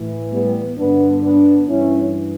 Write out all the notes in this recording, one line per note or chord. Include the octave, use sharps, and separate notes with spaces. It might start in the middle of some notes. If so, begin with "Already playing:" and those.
Already playing: A2 E3
G3 B3
G2 D3 B3 D4
B3 D4
G2 E3 C#4 E4